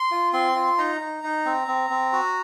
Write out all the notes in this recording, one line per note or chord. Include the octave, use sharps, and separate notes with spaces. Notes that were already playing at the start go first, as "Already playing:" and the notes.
Already playing: C6
F4
C4 C6
F4
D#4 A#5
D#4
D#4
C4
C4
C4
F#4